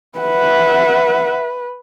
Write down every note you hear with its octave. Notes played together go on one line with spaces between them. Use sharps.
B4 E5 F#5